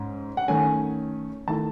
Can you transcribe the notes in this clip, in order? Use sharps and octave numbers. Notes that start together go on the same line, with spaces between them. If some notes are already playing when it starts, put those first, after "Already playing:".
Already playing: G#2 C#4
F#5
D#3 A3 C#4 G#5
D#3 A3 E4 A5